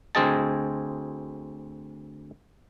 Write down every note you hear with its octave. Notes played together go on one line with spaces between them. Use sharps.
D2 C4 G#4 D#5 A5